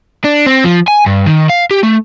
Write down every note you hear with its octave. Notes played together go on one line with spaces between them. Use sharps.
D4
C4
F3
G#5
G2
D#3
F5
G4
A3